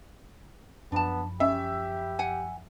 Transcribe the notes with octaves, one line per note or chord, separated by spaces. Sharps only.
F#2 F3 B3 D4 A5 B5
C#4 G4 E5
F#5 G#5